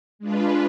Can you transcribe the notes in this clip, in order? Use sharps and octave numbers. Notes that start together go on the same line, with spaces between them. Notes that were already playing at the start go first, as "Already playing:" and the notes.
G#3 D4 F4 B4